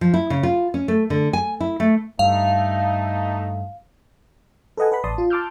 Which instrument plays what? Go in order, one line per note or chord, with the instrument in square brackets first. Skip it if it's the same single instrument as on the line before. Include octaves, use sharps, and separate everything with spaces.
[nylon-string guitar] F3
E4
C#3
F4
C#4
A3
D3
G#5
E4
A3
[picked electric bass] G2 [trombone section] A3 D#4 [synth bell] F5
[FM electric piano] A4 B4 D#5 F#5 G#5
B4 F#5 B5
A1 D5 A5 C6 D#6
F4
A5 C6 D6 E6 F6 G6